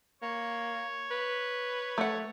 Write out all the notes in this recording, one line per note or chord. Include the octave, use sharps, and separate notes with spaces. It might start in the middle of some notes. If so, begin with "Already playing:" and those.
A#3 C#5
B4
A3 F#5